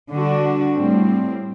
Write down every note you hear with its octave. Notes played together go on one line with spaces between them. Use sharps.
D3 G3 D4 F#4
A2 G3 C4